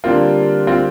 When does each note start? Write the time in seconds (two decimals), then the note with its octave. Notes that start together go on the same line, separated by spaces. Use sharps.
0.04 D3 G3 A#3 C4 F4
0.67 C4 F4